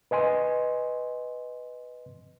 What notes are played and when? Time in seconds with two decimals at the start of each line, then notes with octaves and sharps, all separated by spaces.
0.11 B4 D#5 G#5 C6